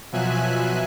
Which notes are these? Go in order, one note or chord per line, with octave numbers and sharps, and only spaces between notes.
B2 F3 F#3 E5 G#5 F#6